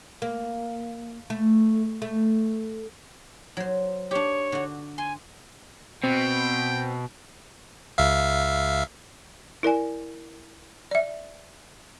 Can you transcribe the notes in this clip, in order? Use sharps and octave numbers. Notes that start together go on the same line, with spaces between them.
A#3
A3
A3
F#3 C5
D4 G4 C#5
D3 F#4
G#5 C6
B2 C4 G5
C#2 E5 F5
E4 A#4 D5 G#5
D5 E5